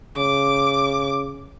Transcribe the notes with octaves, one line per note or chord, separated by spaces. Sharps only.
C#3 D6